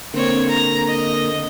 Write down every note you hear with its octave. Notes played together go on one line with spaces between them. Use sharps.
D3 A#3 C4 C#5
A#5
D#5